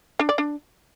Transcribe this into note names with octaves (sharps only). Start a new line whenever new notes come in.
D4
D5
D4